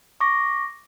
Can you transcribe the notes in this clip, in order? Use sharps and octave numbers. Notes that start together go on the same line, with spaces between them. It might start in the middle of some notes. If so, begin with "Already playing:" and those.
C#6 D6 A#6